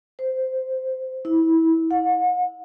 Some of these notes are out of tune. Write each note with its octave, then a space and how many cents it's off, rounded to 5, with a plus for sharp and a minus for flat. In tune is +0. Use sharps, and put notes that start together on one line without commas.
C5 -10
E4 -25
F#5 -40